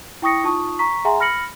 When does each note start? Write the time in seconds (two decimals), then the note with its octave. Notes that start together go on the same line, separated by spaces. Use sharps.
0.22 E4 G5 C#6 D#6 A#6 C#7
0.44 D#4 F4 A5 C#6 D#6
0.79 A#5 C#6 B6
1.05 G#4 E5 F#5 G#5 A#5 C6
1.20 B5 F6 A#6 C#7 F#7